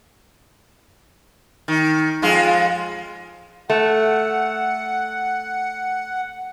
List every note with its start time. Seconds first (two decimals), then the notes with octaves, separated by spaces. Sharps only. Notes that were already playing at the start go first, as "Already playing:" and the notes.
1.68 D#3
2.22 F2 G#3 F4
3.70 A3 F#5